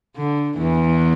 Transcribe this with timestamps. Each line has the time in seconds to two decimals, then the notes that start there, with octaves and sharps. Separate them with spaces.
0.16 D3
0.59 E2 E3